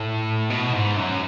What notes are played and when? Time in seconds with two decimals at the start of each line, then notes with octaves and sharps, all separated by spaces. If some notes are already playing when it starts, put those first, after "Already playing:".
Already playing: A2
0.50 B2
0.73 G#2
0.97 F#2